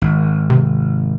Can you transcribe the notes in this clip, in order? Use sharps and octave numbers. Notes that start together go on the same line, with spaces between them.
G#1
C3